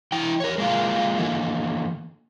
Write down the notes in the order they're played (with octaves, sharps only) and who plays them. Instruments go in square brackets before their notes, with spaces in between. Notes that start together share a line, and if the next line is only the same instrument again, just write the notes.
[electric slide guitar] E3 E4 G5
A#4 C#5
G#3 A#3 F4
D3 E3 A#3